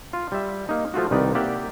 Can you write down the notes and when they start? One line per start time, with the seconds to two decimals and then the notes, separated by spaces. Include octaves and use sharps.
0.13 F4
0.32 G3 E5
0.69 A#3 D#4
0.94 F3 A3 F4 F#4
1.11 C2 D#3 D#4 B4 D5
1.35 A#3 G4 D5 E5 F#5 G5